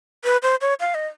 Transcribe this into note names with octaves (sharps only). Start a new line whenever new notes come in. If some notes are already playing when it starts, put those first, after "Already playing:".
B4
C5
C#5
F5
D#5